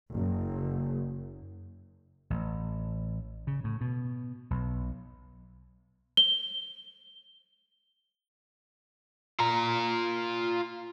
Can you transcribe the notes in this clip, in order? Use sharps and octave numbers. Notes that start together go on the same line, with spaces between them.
F#1
A1
C#3
A2
B2
B1
G7
F4 A#5